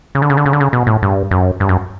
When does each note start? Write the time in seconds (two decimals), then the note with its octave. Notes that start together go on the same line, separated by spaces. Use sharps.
0.15 C#3
0.22 D3
0.30 C#3
0.37 D3
0.46 C#3
0.53 D3
0.60 C#3
0.73 B2
0.87 A2
1.02 G2
1.31 F#2
1.60 G2
1.69 F#2